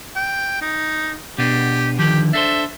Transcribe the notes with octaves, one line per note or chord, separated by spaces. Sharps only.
G5
D#4
B2 B3 D4 G4
D3 D#3 F3 G4
D4 A4 C5 E5